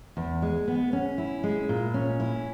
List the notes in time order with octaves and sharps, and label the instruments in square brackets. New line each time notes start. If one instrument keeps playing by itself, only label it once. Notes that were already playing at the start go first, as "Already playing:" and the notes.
[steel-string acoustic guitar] E2
G#3
B3
C#4
E4
G#3
A#2
C#4
E4